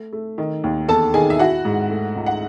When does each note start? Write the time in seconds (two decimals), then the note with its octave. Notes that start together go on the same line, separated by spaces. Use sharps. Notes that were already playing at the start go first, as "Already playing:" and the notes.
Already playing: A3
0.13 A3
0.38 D#3
0.64 D#2
0.88 E2 A4 A5
1.14 D#3 G#4 G#5
1.30 E5
1.39 E4 F#4 F#5
1.65 G#2
1.90 A3
2.16 C#2
2.26 F#5